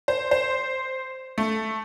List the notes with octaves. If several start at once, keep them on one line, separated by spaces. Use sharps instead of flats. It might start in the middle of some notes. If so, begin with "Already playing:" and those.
C5
C5
A3